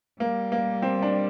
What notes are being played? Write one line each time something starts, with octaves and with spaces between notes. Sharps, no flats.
G3 A#3
A#3
C4
D4